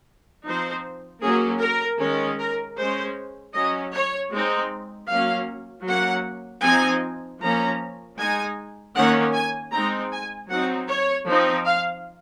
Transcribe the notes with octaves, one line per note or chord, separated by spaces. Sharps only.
F3 C4 D#4 C5
F#3 A#3 C#4 G#4
A#4
D#3 G#3 C#4
A#4
G#3 C#4 C5
F#3 C#4 D#5
C#5
G#3 C4 D#4
F#3 A#3 C#4 F5
F#3 A#3 C#4 F#5
F3 C4 D#4 G#5
F3 A#3 C#4 A#5
G#3 D#4 G#5
D#3 A#3 C#4 F#5
G#5
G#3 C4 D#4 A#5
G#5
F#3 C4 D#4 F#5
C#5
F3 C4 D#4
F5